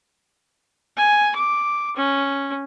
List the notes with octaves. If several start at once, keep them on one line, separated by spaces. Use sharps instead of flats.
G#5
D6
C#4